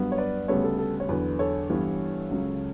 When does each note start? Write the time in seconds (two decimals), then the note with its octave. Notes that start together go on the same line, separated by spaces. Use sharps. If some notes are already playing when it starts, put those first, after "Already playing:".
Already playing: G2 F#3 B3
0.12 C#5
0.18 B4 D5
0.48 D2 C#3 G3 B3 A4 C#5
0.64 A4
0.79 A4
1.00 C#5
1.09 E2 D3 F#3 B4
1.39 A4 C#5
1.69 G2 E3 G3 B3
2.31 C#2 C#3 F#3